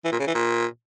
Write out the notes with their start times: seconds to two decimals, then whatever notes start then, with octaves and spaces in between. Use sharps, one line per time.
0.05 E3
0.12 A#2
0.20 C#3
0.27 E3
0.35 A#2